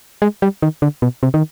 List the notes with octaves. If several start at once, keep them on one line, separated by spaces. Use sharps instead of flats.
G#3
G3
D#3
D3
B2
C3
D#3